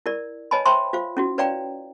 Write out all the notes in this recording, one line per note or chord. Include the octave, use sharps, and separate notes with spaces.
E4 A#4 D5
B4 C#5 D#5 G#5 A5 B5
C5 E5 G5 A5 B5 C6
F4 C5 F5
C#4 E4 F#4
B4 C#5 D5 F5 G5 A#5